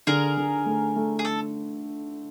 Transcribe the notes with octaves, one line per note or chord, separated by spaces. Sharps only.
D3 G#4 A#4
D3
A3
A3
G#4
A4